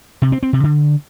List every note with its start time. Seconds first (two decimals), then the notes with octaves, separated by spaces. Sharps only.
0.22 C3
0.32 C4
0.43 C4
0.53 C3
0.63 D3